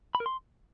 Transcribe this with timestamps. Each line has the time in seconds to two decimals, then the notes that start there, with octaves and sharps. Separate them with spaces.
0.15 B5
0.20 A#4
0.26 C6